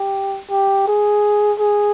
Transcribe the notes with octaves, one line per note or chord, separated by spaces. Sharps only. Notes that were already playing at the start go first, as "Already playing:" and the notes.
Already playing: G4
G4
G#4
G#4